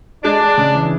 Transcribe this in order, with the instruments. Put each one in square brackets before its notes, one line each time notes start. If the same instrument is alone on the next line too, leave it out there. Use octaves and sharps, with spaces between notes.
[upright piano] G#3 [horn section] D4
[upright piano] G#3
C#3
E3